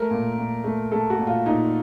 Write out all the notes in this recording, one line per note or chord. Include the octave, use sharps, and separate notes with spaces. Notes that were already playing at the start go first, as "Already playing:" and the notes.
Already playing: A3 A#4
A#2
A#2
A3
A3 A4
F#4
A#2
F4
A#2 D#4